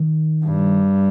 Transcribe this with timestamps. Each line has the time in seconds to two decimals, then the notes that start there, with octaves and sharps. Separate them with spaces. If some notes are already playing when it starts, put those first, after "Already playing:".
Already playing: D#3
0.46 G2